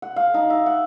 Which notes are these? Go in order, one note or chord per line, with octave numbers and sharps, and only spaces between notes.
F#5
F5
D#4
E5
F#5